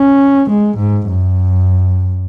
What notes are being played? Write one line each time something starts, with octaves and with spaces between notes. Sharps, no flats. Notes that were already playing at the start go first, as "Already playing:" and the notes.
Already playing: C#4
G#3
G#2
F#2